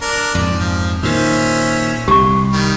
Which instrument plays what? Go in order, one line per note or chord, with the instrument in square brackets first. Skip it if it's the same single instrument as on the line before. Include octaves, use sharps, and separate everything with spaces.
[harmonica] D4 A#4
[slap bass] F2 G#2 [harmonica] D5
[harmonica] F3
[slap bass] A#2 D#3 [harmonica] C#4 C5 E5
[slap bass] C2 [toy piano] G4 C#6
[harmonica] D#3 G3